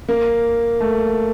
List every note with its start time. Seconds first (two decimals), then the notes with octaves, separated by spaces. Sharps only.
0.09 A#3
0.80 A3